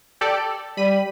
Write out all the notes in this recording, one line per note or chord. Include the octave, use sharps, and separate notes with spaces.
G4 A4 D5
G3 B5 D#7